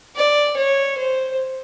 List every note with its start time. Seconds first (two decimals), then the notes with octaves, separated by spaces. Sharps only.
0.17 D5
0.57 C#5
0.98 C5